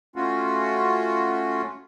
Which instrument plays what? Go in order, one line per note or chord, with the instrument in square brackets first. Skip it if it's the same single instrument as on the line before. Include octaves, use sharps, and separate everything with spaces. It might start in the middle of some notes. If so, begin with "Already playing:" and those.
[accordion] A3 C#4 F4 F#4